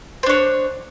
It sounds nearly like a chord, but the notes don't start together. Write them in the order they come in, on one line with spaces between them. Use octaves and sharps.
C5 D4 C#5